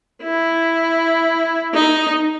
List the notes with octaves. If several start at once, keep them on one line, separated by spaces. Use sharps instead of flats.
E4
D#4